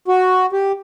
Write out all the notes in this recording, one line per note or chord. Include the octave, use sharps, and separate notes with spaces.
F#4
G4